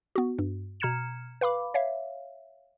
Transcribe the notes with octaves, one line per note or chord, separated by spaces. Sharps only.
B3 F#4
G2
B2 A#5 F6 G#6 C#7 E7
B4 F5 B5 D6
C#5 E5 F5